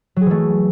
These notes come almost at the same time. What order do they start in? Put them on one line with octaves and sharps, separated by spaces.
F#3 G#4 E3 A3